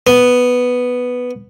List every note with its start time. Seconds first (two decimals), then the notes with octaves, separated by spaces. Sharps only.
0.07 B3